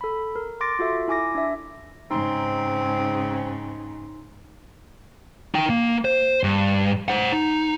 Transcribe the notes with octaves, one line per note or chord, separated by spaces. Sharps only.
A4 B5
A#4
C6 D6 A6 A#6 D7
F4 F#4 A4 E5
E4 G#5 D6 A#6
D4 E5
G#2 C#3 C4 D#4 C6
D#4 G5
A#3
C5
G2
C5 F#5
D#4